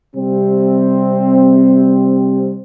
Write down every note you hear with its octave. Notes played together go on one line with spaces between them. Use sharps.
C3 G3 C4